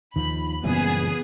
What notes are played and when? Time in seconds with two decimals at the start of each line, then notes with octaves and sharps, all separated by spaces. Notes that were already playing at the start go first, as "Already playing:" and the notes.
0.16 D#2 D#3 F3 B5
0.64 F#2 A#2 C#3 E3 G3 B3 C4 G#4